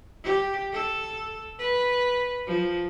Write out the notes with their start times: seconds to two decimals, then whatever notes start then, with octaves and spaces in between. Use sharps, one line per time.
0.23 G4
0.73 A4
1.59 B4
2.47 F3